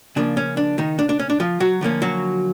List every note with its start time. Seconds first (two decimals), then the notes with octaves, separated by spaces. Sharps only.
0.16 C#3 F3 A#3 D4
0.37 C#4
0.57 D4
0.78 D#3 D#4
0.99 D4
1.09 D4
1.19 C#4
1.30 D4
1.40 F3 F4
1.60 F#3 F#4
1.81 D3 F3 A#3 C#4
2.02 F#3 F#4